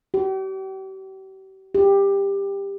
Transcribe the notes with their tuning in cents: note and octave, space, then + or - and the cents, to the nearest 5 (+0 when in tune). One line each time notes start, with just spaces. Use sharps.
G4 -40
G4 +15